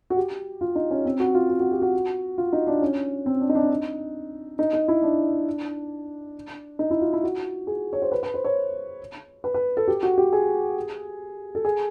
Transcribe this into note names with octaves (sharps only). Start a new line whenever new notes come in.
F#4
G4
F4
D#4
C#4
C4
F#4
F4
F#4
F#4
G4
F#4
F4
D#4
D4
C#4
C4
D4
D#4
D4
D#4
D#4
D#4
E4
D4
D#4
E4
F4
E4
F#4
G#4
C#5
C5
B4
B4
C5
C#5
B4
B4
A4
G4
F#4
G4
G#4
A4
G#4